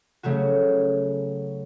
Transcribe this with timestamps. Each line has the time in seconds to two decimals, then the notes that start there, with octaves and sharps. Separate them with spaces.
0.23 C#3 F#3 A3 F#4